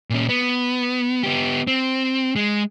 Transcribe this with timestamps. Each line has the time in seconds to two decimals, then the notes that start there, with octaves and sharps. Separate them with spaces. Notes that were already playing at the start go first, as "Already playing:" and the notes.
0.10 A#2 C#4
0.29 B3
1.23 B3 G4
1.67 C4
2.36 G#3